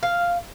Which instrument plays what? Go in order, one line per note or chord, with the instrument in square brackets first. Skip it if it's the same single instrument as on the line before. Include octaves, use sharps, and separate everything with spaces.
[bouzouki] F5